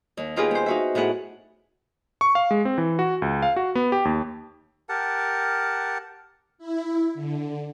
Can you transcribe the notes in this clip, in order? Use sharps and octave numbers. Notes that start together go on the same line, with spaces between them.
D#2
B3 D#4 F4 G4 G#4 B4
B3 C5
D#4 F#4 E5
A2 B3 G#4 F#5
C#6
F5
G#3
C4
E3
F#4
C#2
F5
F#4
B3
G4
D#2
G4 A#4 F#5 A5
E4
D3